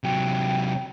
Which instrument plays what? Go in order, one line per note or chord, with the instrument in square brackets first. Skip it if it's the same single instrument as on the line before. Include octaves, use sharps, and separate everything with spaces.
[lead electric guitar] C3 F#3 [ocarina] G5